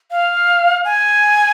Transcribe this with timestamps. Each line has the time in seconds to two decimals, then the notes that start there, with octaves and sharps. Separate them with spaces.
0.11 F5
0.85 G#5